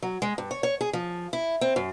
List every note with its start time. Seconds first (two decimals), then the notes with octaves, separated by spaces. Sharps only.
0.02 F#3
0.22 G#3
0.38 G2
0.51 C#5
0.63 C#5
0.81 G#4
0.93 F3
1.33 E4
1.61 C4
1.76 F#2